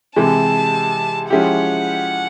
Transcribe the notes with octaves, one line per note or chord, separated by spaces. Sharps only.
C3 E3 G#3 A5
F3 G#3 C#4 E4 G4 F#5